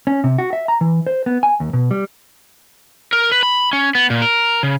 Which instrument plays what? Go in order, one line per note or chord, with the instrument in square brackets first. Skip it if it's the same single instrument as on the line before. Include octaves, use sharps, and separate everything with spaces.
[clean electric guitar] C#4
C3
F#4
E5
A#5
E3
C5
B3
G#5
D#2
B2
G3
[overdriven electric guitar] A#4
B4
B5
C#4
B3
A#2
A#4
C#3